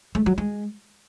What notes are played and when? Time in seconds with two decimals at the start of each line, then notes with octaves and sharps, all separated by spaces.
0.15 A3
0.26 F#3
0.38 G#3